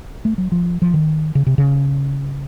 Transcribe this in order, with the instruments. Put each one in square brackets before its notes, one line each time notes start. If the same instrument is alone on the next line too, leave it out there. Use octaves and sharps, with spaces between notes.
[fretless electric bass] A3
F#3
F3
F3
D#3
C#3
C3
C#3